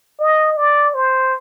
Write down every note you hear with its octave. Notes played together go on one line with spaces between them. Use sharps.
D#5
D5
C5